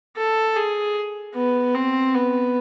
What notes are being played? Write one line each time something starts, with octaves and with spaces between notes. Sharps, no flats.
A4
G#4
B3
C4
B3